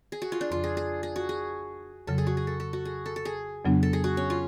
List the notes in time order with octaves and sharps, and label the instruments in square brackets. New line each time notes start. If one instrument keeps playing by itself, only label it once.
[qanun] G#4
F#4
F4
D4
[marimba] F2 C#3 F3 [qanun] F4
[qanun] G#4
G#4
G#4
F#4
G#4
[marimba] F2 C#3 F#3 [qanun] A4
[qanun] G#4
F#4
G#4
A4
A4
F#4
G#4
A4
A4
G#4
[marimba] F2 C#3 F#3 B3 D4
[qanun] A4
G#4
F#4
C#4
F4